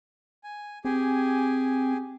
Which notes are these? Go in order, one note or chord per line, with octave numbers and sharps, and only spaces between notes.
G#5
C4 G4 G#4 G#5